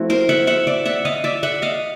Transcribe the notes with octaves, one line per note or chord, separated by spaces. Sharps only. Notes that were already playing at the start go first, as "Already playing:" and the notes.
Already playing: F3 A3 C4 E4 F#4
A#4 C5
E5 F#5
E5 F#5
D5 E5
E5 F#5
D#5 F5
D5 E5
E5 F#5
D#5 F5